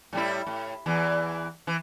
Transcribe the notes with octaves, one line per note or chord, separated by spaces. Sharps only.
A2 G3 E4
A2
E2 E3
E3